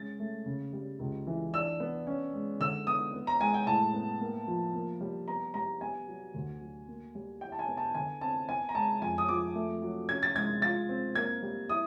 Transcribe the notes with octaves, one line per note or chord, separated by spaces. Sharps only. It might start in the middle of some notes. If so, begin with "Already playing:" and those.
Already playing: G#3 C#4 A6
A3
C#3
G3
C#2
E3
D4 E6
B3
C#4
G#3
D3 E6
B3 D#6
B3
A#5
G#3 G#5
G5
A2 A5
B3
A#3
F3
A#3
G3
B3 A#5
G3 A#5
B3 G#5
F#3
D2
F#3
A#3
G3
E4 G5
A5
G#5
B3
A5
D3 G#5
C4 A5
B3 G#5
A#5
G#3 A5
F2 G#5
D#6
F3 D6
A3
F#3
C#4 G#6
A6
G#3 G#6
F4 A6
C4
A#3 G#6
G3
E4 D#6